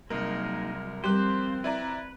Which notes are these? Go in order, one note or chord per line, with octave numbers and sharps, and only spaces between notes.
C2 F#3 G#3 A#3 D#4 A#4
F3 G3 C4 F4 G4 A#4 C5 F#6
E4 B4 D5 A#5